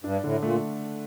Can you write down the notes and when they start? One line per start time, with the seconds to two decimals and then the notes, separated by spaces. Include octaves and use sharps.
0.04 G2 D4
0.23 A2 D3
0.42 A#2 A3